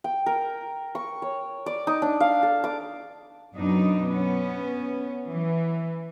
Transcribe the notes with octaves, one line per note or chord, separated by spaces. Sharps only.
G5
A#4
C#6
C#5
D5
D#4
D4
F5
A4
D6
F#2 B2 D4 D#4
B3 C#4
E3